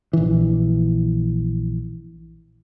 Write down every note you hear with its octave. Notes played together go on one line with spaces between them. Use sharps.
A#1 E3